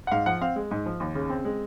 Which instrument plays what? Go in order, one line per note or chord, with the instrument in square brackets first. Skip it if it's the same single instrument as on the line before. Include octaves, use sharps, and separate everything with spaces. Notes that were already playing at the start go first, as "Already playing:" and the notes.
[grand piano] F#5
G#2 F5
F3 F#5
C4 F5
G#3
G#2
F3
D#2
C#3
C4
G#3